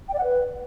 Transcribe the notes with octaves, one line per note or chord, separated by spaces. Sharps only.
G5
D5
F#5
B4